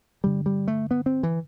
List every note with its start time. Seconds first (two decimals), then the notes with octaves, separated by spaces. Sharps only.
0.23 G2 D3 G3
0.46 G3
0.68 A3
0.91 B3
1.06 C4
1.23 E3